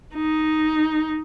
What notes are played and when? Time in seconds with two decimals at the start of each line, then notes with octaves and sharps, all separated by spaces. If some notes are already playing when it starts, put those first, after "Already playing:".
0.16 D#4